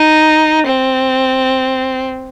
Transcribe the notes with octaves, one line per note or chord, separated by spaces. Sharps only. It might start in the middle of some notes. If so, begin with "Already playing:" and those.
Already playing: D#4
C4